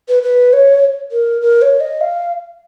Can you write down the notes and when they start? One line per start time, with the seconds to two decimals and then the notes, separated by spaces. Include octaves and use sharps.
0.08 B4
0.23 B4
0.53 C#5
1.11 A#4
1.41 A#4
1.62 C#5
1.80 D#5
2.01 F5